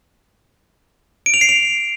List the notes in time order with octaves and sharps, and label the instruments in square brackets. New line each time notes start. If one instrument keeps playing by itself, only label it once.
[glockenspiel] D7
F7
C7
F7